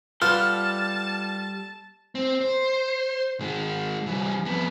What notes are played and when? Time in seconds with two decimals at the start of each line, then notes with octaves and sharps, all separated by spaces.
0.22 G3 F4 A4 B4 F#5 A5 F6
2.15 C4
2.41 C5
3.40 D#3 G#3
4.06 E3 G3
4.45 F2 B3